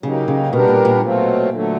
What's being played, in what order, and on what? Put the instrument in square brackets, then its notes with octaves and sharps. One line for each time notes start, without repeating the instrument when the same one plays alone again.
[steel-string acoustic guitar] C#3 [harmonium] F#3 A#3 D#4 G4
[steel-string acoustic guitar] C#3
[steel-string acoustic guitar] B2 [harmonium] G3 B3 D4 G4 A#4
[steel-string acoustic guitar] A#2
A#2
[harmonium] B2 F#3 A3 C4 F4
D3 F#3 A3